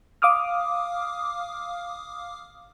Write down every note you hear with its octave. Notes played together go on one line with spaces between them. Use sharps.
F5 D6 D#6 F6